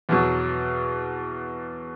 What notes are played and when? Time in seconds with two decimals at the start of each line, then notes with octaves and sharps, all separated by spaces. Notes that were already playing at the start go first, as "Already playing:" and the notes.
0.09 E2 B2 F#3